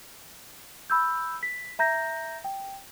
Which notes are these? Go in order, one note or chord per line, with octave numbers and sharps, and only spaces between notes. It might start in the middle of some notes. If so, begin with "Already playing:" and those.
B5 E6 G6
B6
E5 A#5 G6 A#6
G5